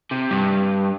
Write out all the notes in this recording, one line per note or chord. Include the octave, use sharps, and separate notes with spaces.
C3
G2